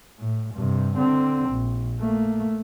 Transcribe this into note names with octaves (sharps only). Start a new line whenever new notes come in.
A2
G2 C3
D3 C4
A#1
A3 A#3